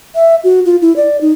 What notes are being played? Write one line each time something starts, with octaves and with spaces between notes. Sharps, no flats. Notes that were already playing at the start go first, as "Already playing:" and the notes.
E5
F#4
F4
E4
D5
D#4